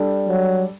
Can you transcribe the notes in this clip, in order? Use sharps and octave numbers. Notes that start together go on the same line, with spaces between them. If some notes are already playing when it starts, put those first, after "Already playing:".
Already playing: G3 D4 A4 D5
F#3